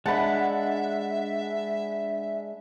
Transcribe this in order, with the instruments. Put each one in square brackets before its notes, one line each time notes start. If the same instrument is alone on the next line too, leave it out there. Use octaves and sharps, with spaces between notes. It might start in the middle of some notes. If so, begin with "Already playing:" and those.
[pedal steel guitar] G#3 D4 [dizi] E5 [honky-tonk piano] F#5 [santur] A5 B5